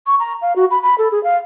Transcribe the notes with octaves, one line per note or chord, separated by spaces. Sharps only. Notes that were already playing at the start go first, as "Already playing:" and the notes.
C#6
A#5
F5
F#4
B5
B5
A4
G#4
F5